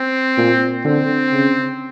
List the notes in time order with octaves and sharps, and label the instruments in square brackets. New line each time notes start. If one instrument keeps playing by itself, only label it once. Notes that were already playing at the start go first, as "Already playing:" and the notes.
Already playing: [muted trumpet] C4
[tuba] A#2
[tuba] D3 [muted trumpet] C4
[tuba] C#3